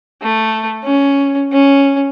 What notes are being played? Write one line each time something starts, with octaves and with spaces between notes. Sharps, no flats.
A3
C#4
C#4